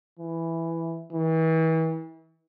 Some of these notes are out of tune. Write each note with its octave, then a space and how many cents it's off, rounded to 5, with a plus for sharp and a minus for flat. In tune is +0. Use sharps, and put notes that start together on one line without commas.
E3 +5
E3 -35